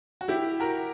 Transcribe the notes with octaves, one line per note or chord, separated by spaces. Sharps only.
F#4
E4 G4
F#4 A#4